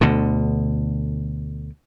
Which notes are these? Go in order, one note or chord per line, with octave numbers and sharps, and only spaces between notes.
D2 B2 D3